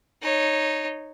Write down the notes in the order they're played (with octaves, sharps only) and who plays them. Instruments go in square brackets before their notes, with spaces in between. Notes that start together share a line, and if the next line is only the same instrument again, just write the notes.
[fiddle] D#4 C#5